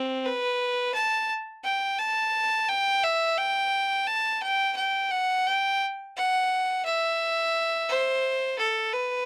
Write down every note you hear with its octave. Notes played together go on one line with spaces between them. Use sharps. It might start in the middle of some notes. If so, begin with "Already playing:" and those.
Already playing: C4
B4
A5
G5
A5
G5
E5
G5
A5
G5
G5
F#5
G5
F#5
E5
C5
A4
B4